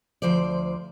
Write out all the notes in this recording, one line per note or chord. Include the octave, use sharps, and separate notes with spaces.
D2 F3 C5 D5